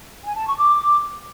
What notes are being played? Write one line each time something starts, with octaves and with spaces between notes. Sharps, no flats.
G#5
A5
C#6
D6